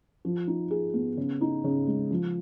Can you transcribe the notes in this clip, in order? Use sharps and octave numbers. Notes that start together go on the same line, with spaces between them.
F3
D#4
G#4
B3
C#3
D#4
C#3
G#3
F3